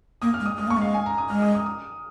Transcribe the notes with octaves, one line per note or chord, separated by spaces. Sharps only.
A#3 D#6
F6
G#3
D#6
G#3 D#6
A#3 C#6
G#3 F5
G#5
A#5
D#6
G#3 F6
D#6
D#6
D#6